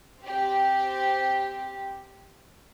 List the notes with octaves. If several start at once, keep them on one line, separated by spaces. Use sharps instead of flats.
C4 G4